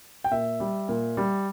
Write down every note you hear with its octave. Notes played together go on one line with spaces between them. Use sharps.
G5
A#2 E5
G3
A#2
G3